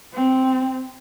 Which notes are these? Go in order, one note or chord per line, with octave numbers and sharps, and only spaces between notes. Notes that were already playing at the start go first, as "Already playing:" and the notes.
C4